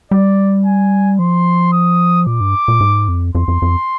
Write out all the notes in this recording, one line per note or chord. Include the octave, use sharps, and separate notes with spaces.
G3 D5
G#5
F3 C6
D#6
A#2 D6
G2
A#2
G#2
F2
F2 C6
F2
F2